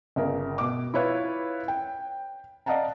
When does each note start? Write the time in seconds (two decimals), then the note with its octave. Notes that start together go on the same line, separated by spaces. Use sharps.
0.16 G1 C#3 A#4
0.58 B2 D6
0.94 E4 F4 B4 C#5 E5
1.68 G5
2.66 D5 D#5 F5 F#5 A5 A#5